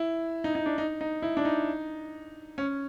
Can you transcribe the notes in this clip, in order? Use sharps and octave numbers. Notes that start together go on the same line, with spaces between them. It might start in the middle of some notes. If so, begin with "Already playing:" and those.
Already playing: E4
D#4
D#4
D4
D#4
D#4
E4
D4
D#4
C#4